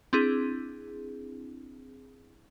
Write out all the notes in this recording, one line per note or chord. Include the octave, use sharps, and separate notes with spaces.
C4 D4 E4 G#4